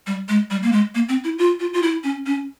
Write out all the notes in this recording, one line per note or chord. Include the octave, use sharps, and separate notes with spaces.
G3
G#3
G3
A#3
G#3
A#3
C4
E4
F4
F4
F4
E4
C#4
C#4